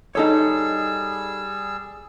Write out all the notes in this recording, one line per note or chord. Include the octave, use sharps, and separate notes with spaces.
G3 D#4 G#4 A4 C#5 E6